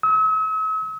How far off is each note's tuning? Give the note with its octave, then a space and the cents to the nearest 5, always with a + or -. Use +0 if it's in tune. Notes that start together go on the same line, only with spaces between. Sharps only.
E6 -45